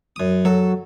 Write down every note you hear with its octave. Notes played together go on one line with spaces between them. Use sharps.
F#2 D#6
F#3 A4